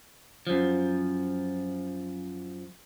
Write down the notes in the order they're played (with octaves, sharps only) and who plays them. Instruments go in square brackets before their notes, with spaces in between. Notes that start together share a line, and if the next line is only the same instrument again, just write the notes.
[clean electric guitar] F#2 F3